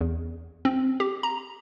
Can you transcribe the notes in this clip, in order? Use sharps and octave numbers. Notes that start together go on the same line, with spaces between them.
E2
C4
G4
A#5